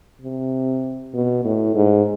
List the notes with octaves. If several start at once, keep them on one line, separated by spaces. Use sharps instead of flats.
C3
B2
A2
G#2